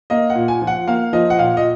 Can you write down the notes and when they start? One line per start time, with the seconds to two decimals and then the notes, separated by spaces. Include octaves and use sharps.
0.10 A#3 D#5
0.30 F#5
0.35 A#2
0.48 G#5
0.62 F3
0.67 F#5
0.88 A#3 F5
1.13 F3 D#5
1.30 F#5
1.38 A#2 F5
1.57 D#5